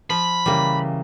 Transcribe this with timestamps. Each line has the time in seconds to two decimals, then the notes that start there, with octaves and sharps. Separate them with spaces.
0.10 F3 B5
0.46 C#3 E3 G3 A#3